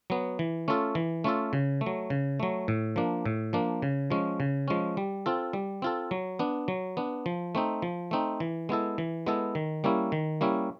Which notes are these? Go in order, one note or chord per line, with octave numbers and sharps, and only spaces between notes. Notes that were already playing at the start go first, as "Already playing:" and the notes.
F#3 B3
E3
A3 C#4 F4 A4
E3
A3 C#4 F4 A4
C#3
A3
F#3
C#3
F#3 A3
A2
F3 A#3 D4
A2
F3 A#3 D4
C#3
F3 G#3 C#4
C#3
F3 G#3 C#4
G3
C4 F4 A4
G3
C4 F4 A4
F#3
B3 D4
F#3
B3 D4
F3
A3 C4 D#4
F3
A3 C4 D#4
E3
G#3 B3 E4 A4
E3
G#3 B3 E4 A4
D#3
G3 A#3 C#4 E4
D#3
G3 A#3 C#4 E4